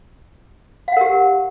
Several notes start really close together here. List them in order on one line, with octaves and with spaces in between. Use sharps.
F5 F#5 A#4 G4